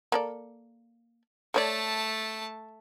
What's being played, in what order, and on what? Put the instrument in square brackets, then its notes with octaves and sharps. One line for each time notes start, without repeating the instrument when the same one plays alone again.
[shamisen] A#3 A4 D5
[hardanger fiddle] A3 A5 [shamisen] A4 C#5 D5